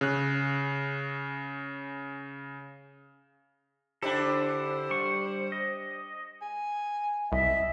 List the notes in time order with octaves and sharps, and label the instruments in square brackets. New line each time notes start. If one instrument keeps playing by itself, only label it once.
[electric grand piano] C#3 F#6
[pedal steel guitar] D3 E4 A4 [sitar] D4 G4 [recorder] C5
[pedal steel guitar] G3 C#6
D#5
[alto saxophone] G#5
[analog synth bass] C2 [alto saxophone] D#5 [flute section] E5